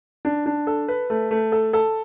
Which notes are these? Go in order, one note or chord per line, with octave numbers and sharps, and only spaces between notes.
D4
D4
A4
B4
A3
A3
A4
A4